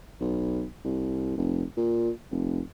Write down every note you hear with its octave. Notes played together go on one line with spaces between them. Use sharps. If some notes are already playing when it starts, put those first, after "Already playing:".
B1
C2
F1
A#2
F1